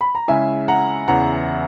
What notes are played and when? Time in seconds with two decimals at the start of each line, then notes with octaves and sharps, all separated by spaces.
0.01 B5
0.15 A#5
0.28 C#3 G#3 C#4 E4 E5 G#5
0.68 F#5 A#5
1.08 E2 C#3 E3 F#5 A#5